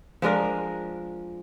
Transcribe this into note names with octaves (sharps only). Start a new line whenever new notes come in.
F3 G#3 D4 A#4